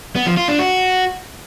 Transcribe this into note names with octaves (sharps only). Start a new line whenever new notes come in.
B3
F3
F4
D4
F#4